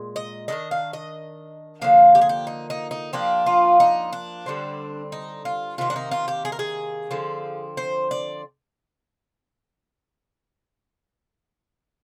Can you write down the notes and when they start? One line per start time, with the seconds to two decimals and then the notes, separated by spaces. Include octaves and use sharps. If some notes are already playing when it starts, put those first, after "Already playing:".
Already playing: A#2 G#3
0.16 D#5
0.48 D#3 G3 D4 D#5
0.71 F5
0.93 D#5
1.81 D3 F3 A#3 F5
2.15 G4
2.21 G#4
2.29 G4
2.47 D#4
2.70 D#4
2.91 D#4
3.13 F3 A#3 D4 G4
3.46 F4
3.80 D#4
4.13 D4
4.46 D3 G3 C4
5.12 D#4
5.45 F4
5.78 C3 D#3 A#3 F4
5.90 D4
5.96 D#4
6.11 F4
6.28 G4
6.45 G#4
6.52 A#4
6.59 G#4
7.11 D3 F3 C4
7.77 C5
8.11 D5